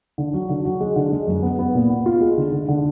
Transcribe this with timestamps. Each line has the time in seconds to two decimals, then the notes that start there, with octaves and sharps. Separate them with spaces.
0.18 D3
0.33 F#3
0.49 D3
0.65 F#3
0.80 G#3
0.96 D3
1.12 G#3
1.27 F#2
1.43 B3
1.59 B3
1.75 A#2
1.90 B3
2.06 F4
2.21 G#3
2.37 D3
2.52 D3
2.69 D3